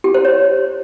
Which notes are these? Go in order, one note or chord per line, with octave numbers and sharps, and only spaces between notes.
G4
C5
C#5